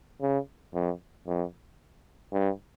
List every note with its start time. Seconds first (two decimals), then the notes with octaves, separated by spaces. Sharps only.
0.22 C#3
0.74 F2
1.27 F2
2.33 G2